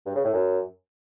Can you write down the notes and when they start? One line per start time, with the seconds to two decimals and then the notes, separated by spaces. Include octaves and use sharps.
0.06 G2
0.15 C#3
0.24 A2
0.33 F#2